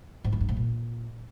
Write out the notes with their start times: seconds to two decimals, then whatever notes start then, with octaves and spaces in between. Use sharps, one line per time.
0.24 G#2
0.32 E3
0.41 G2
0.49 G#2
0.57 A#2